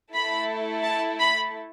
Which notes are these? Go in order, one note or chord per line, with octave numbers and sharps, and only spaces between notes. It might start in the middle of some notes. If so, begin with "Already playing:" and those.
A3 E4 A4 B5
A5
B5